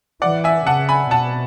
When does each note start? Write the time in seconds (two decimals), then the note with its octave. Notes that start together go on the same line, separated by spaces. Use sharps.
0.22 E3 D5 F#5
0.44 E5 G#5
0.67 C#3 F#5 A5
0.89 G#5 B5
1.11 B2 F#5 A5